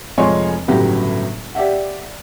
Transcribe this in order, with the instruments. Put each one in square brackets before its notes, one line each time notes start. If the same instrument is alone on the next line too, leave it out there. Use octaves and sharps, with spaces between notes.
[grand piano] F1 F3 G#3 C#5 G#5 C6
G1 A2 C#3 F#3 G4
G4 D5 E5 F#5